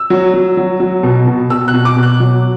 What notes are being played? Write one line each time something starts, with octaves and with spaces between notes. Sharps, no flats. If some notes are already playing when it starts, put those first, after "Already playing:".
Already playing: E6
F#3
F#3
F#3
F#3
B2
B2
B2 E6
F#6
B2
D6
B2
F#6
F#3